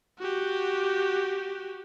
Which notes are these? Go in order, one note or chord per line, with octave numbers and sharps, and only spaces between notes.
F#4 G4